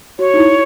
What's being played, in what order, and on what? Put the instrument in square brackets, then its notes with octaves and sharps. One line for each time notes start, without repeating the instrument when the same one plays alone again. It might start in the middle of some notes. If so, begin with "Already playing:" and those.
[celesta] F#4 [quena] C#5
[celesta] D#4
E4